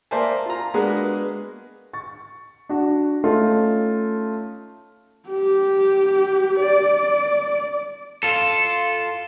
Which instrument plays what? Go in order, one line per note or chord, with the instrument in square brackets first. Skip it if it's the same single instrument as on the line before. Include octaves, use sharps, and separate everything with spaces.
[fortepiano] A#3 C5 D5 E5 G#5 A5
F4 A#5
G#3 A#3 B3 D4 F#4 G#4
[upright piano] C#6 A6
D4 F#4
A3 C#4 D#4 F4 A4
[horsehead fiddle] G4
D5
[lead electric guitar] F4 A4